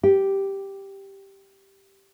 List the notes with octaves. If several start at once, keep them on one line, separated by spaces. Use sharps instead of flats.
G4